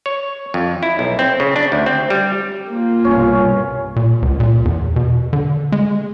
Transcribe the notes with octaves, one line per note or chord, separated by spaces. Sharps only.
C#5
F2
E4
B1
C4
C#3
D4
D2
C4
G3
A#3 F4
C2 G2 B2 C#4
A#2
C#2
A#2
E2
B2
D3
G#3